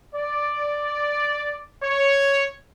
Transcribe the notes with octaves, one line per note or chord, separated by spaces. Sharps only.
D5
C#5